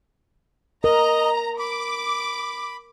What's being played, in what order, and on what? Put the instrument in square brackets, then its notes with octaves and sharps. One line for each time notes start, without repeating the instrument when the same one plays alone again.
[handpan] A#4 [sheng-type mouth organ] D#5 [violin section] A#5
[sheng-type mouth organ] B5 [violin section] D6